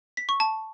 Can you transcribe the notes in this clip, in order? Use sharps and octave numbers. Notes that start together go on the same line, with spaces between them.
B6
C#6
A5